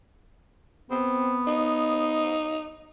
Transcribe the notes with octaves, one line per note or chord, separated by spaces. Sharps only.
B3 C4
D#4